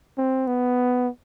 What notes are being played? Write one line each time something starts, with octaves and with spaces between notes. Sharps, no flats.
C4
B3